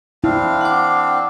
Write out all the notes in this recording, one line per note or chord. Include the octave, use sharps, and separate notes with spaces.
C4 D4 E4 F5
F#5 D6